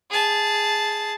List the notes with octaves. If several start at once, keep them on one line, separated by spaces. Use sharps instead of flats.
G#4 A5